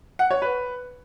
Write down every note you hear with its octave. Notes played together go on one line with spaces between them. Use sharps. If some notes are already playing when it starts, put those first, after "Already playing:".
F#5
C#5
B4